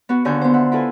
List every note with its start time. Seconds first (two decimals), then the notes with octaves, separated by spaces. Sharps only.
0.09 B3 F#4
0.25 D#2 D3 F#4 G#5 G6
0.41 B3 C5
0.54 E5 F#5
0.72 E4 F4 A4 B4 G#5